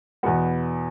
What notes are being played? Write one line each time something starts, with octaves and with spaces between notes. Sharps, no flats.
E2 B2 B3 F#4